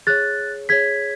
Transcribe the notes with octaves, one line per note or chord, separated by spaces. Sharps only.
G#4 C#5 F#6 A6
G#4 C#5 G#6 B6